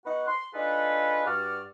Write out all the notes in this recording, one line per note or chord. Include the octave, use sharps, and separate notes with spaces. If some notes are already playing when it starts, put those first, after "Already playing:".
B3 D#4 F#4 B4 F#5
C6
D4 D#4 F4 G#4 A4 B4
G2 F#4 D5 F6